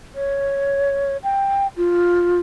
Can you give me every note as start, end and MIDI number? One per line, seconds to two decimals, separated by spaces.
0.15 1.17 73
1.23 1.67 79
1.77 2.40 65